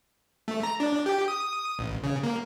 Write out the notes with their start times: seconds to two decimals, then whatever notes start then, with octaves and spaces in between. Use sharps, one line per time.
0.48 A3
0.63 A#5
0.80 D4
1.06 G4
1.28 D#6
1.79 A1
2.04 C#3
2.23 A#3